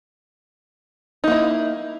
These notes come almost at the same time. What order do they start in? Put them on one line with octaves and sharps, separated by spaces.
D#4 A#3 E4